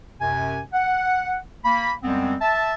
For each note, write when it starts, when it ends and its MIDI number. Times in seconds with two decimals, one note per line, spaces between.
0.20 0.59 42
0.20 0.59 48
0.20 0.59 80
0.73 1.36 78
1.64 1.92 58
1.64 1.92 83
2.03 2.34 42
2.03 2.34 55
2.03 2.34 56
2.03 2.34 59
2.03 2.34 60
2.41 2.74 76
2.41 2.74 81